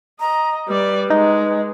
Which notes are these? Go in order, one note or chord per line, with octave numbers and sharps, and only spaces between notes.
D#5 A#5
G3 B4 D5
G#3 D#4